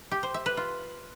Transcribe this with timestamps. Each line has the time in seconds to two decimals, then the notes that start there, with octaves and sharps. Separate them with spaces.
0.11 G4
0.23 C5
0.34 E5
0.46 B4
0.57 F4